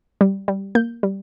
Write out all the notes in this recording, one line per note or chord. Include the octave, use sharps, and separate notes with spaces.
G3
G3
A#3 G6
G3